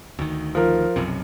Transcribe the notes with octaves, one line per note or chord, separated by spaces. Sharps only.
D2 D#3
F3 A#4
B1 F#2 C3